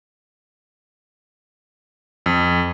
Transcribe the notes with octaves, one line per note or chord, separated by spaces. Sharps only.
F2